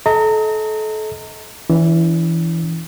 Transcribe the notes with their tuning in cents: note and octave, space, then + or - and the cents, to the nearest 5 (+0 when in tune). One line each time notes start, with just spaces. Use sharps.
A4 -30 D#5 +35 A#5 -30
E3 +0 C#4 +45